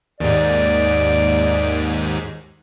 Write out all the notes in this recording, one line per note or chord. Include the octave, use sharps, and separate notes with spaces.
D#2 G#2 D5